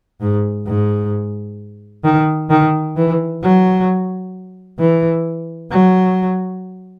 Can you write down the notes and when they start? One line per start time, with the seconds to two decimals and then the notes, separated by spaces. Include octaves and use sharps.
0.21 G#2
0.67 G#2
2.04 D#3
2.50 D#3
2.96 E3
3.42 F#3
4.79 E3
5.71 F#3